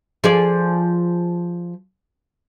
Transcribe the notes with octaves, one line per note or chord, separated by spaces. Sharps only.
F3 G#4 D5